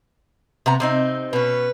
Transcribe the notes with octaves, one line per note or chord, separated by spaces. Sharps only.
C3 B3 A#5
C3 C4 D#4
B2 C#4 B4